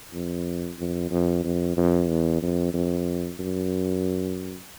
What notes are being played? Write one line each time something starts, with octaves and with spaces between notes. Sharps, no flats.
F2
F2
F2
F2
F2
E2
F2
F2
F#2